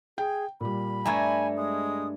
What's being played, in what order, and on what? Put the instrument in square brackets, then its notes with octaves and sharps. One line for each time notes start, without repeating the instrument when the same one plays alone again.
[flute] G#4 [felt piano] G5
[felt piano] A#2 G3 [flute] B5
[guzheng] G2 A3 [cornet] G#5 [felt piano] A#5 C#6 G#6
[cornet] G#3 [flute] D#6